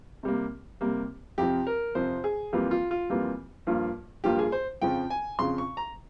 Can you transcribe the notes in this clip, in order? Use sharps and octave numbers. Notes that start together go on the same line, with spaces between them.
C3 G3 A#3
C3 G3 A#3
F2 C3 F3 G4
A#4
F2 C3 F3 C5
G#4
F2 E3 G3 A#3 F4
F4
F4
F2 E3 G3 A#3 F4
G2 F3 A#3 F4
G2 F3 A#3 F4 G4
G#4
C5
F2 C#3 F3 G5
G#5
F2 C#3 F3 C6
C#6
A#5